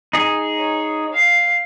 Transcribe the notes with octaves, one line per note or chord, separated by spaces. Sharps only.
D#4 G#4
C#5
F5